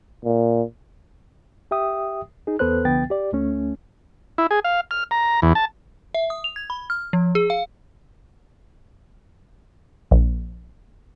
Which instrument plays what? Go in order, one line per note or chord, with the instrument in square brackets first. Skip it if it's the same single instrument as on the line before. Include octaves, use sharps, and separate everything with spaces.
[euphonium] A#2
[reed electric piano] G4 E5 G5 D#6
D#4 G#4
E2 B3 A4 B4 C5 F#6
C2 D3 F3 B3 G5 A6
G4 D5
D2 A3 C#4
[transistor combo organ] E4
G#4
F5
F6
A#5
E2
A5
[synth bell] E5
D#6
F7
G#6
B5
F6
F3
G#4
F5
[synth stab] A#1